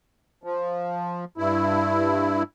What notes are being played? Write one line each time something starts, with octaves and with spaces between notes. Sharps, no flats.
F3
G2 E4